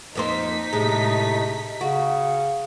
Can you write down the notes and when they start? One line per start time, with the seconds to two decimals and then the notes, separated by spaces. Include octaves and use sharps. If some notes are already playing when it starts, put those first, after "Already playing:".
0.15 F2 A#3 D#4 C5 B6
0.73 A2 C3 G#3
1.81 C#3 F#4